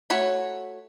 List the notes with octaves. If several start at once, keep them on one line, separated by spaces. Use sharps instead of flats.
A3 F#4 C#5 B5